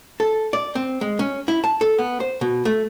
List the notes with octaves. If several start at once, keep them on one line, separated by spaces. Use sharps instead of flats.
A4
D5
C4
G#3
C#4
E4
A5
A4
B3
C5
B2
A3